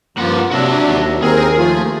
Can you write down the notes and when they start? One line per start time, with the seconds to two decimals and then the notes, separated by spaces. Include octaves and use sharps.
0.17 G2 F3 A#3 F4 F#5
0.52 C3 F#3 D4 F#4 E5
0.88 D#2
1.23 D#2 C4 G#4 A#4
1.58 F3 A3 F4